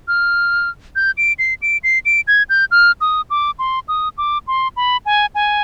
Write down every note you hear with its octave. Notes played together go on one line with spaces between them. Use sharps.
F6
G6
D7
C7
D7
C7
D7
G#6
G6
F6
D#6
D6
C6
D#6
D6
C6
B5
G#5
G#5